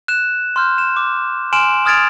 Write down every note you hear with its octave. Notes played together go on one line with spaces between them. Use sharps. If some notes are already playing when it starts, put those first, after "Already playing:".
F#6 E7
C6 F6 G6
E7
D6
G#5 C6 F6 D7 E7 F#7
D#6 F6 G#6 A6 D7 F7